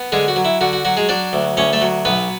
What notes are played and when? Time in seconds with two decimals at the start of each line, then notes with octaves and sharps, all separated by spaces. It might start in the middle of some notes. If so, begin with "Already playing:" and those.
Already playing: B3
0.12 D3 G#3 G#4
0.28 F#4
0.36 F#3
0.45 E4
0.61 D3 F#4
0.73 F#4
0.85 F#3 F#4
0.97 G#3 G#4
1.09 F#3 D4 D5
1.33 D2
1.57 D2 C#4 C#5
1.73 A3 A4
1.81 F#3
2.05 B1 B3 B4